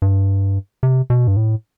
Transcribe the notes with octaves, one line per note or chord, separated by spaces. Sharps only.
G2
C3
B2
G2
A2